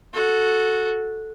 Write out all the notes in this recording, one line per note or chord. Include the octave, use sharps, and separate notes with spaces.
F#4 A4